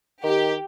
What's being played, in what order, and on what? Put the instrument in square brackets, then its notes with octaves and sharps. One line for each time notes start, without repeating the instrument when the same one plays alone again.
[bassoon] D#3 [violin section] G4